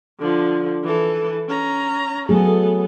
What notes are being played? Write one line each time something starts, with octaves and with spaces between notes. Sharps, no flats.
D3 F3
E3 A4
C#4 A#5
F#3 A3 B3 G#4 A4